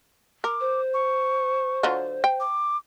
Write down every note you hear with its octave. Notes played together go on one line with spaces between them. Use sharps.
A#4 D6
C5
C#6
D3 F#3 F4
G5
D6